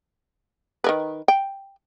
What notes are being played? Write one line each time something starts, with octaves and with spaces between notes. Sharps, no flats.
D#3 A#4 B4
G5